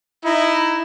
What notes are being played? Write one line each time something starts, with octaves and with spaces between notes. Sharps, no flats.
D#4 E4